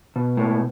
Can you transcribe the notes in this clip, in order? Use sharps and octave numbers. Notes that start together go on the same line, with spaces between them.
B2
A2